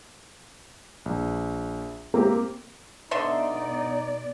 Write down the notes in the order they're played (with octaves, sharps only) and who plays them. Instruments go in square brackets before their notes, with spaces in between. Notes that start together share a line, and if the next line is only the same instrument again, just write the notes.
[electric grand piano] A#1
[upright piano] A#3 [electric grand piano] C4 G4
[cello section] B2 D5 [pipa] D3 E5 C6 [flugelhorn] D#4